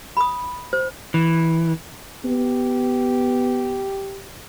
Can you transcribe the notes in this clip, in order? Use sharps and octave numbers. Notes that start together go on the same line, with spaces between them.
B5 D#6
C5
E3
B3 G4